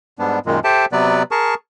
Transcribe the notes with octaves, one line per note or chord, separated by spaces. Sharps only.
G#2 G3 B3 D4
F#2 A#2 D#3 G#3
G4 A4 C5 E5 G5 A5
C3 F#3 B3 B4 D5
G#4 A#4 A5 C#6